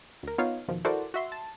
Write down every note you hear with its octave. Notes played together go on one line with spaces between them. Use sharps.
D2 A#4
B3 D#4 F4 C#5 F5
E2 B2 D#3 F3
E4 F#4 A4 A#4 C5 D5
F#4 E5 C6
A5